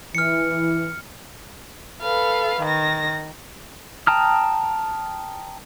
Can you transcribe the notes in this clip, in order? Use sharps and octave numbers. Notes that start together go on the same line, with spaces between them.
E3 F6 C#7
A4 B4 F5
D#3 A#6
G5 A5 A#5 D#6 F6